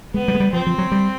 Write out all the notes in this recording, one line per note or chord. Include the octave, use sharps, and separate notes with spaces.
G#3 B3
G3
G#3
G3
F3 C4
F3
F#3
G3